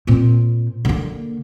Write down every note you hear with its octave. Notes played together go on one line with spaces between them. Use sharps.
A#2 C4
D3 A#3